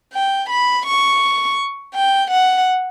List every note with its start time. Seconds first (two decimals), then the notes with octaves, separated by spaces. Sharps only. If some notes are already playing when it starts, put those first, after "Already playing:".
0.14 G5
0.50 B5
0.86 C#6
1.95 G5
2.31 F#5